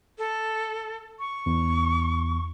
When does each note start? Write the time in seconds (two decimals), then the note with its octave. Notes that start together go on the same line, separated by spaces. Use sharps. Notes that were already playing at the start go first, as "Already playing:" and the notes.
0.18 A4
1.19 C#6
1.46 E2